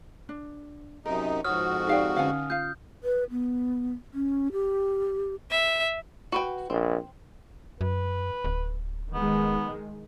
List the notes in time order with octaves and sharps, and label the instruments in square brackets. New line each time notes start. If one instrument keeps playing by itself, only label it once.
[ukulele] D4
[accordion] F#2 C3 D#4 [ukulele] A#4
[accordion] F2 G#2 F#4 [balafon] C#5 [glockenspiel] D#6 F6
[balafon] D#4 G4 D5 [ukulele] G#4 F5 G5
[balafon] D3 C#4 [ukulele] F5 F#5 G#5
[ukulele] F4 F5 [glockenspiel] G6
[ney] B4
B3
C#4
G4
[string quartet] E5
[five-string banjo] F#4 B4 G5
[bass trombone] A#1 [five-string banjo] C4
[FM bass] F#2 [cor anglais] B4
[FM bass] D1
[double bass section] D#3 G#3 [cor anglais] B3